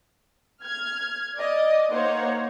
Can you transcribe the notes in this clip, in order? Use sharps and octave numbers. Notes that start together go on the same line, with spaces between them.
F6 G#6
D5 D#5
A#3 D#4 C5 C#5 F#5 A#5